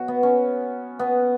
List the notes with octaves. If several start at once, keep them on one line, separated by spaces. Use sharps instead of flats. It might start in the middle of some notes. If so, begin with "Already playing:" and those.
Already playing: B2 F#3 F#4
B3
C#4
B3